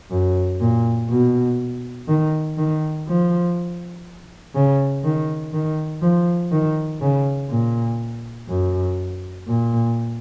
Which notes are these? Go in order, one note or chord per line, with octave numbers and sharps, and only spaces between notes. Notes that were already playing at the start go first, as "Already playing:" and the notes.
F#2
A#2
B2
D#3
D#3
F3
C#3
D#3
D#3
F3
D#3
C#3
A#2
F#2
A#2